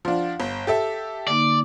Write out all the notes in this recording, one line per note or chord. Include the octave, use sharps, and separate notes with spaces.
F3 D4 F5 F#5 C6
G1
G4 A4 E5
D3 A#3 D#4 D5